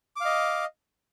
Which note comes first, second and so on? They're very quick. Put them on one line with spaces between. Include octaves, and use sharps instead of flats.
D6 F5 D#5